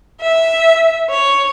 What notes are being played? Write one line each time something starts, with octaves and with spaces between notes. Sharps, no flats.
E5
C#5